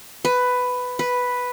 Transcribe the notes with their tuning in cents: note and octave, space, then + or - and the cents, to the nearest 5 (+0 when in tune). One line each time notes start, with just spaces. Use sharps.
B4 +10
B4 +0